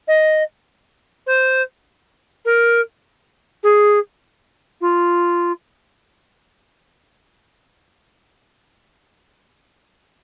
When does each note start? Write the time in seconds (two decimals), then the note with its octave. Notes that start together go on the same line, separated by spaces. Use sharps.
0.08 D#5
1.27 C5
2.45 A#4
3.63 G#4
4.81 F4